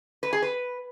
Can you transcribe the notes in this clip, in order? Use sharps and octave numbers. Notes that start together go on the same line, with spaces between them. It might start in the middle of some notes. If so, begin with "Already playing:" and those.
B4
G#4
B4